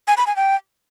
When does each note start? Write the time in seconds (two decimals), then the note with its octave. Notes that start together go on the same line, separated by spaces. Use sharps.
0.08 G#5
0.17 B5
0.27 G#5
0.36 G5